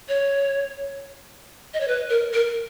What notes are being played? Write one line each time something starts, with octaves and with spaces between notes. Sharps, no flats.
C#5
D#5
C#5
B4
A#4
A#4